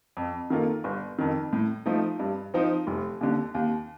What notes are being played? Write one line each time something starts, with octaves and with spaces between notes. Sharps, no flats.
F2
D#3 A#3 F4 A4
G1
F2 D#3
A2
F3 A3 D#4
G2
F3 C4 D#4
F1
D#2 D3
D#2